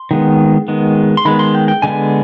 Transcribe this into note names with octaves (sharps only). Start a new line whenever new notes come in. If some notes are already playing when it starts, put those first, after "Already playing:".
Already playing: C6
D#3 G#3 B3
D#3 G#3 B3
C6
D#3 G#3 B3 B5
C6
G5
G5
D3 G#3 B3 G#5